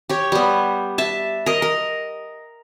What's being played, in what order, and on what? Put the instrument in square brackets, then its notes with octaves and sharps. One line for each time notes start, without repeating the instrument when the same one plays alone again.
[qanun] G4 C#5
G3 B3
E5 A5
A#4 D#5
A#4